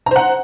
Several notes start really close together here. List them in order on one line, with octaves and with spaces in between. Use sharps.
A#5 C5 F#5